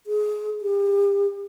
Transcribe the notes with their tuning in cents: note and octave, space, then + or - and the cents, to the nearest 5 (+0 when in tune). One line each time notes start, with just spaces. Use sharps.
G#4 +20
G4 +35